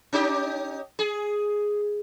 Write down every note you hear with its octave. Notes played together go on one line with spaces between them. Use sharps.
C#4 D#4 G4
G#4